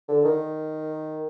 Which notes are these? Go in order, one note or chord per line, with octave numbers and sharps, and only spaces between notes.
D3
D#3